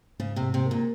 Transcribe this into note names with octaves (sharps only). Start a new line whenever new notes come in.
G#2 C#3
C3
G#2
C3
A#3
A#2